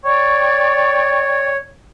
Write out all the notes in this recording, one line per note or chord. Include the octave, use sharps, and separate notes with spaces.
C#5 D5 G5 C#6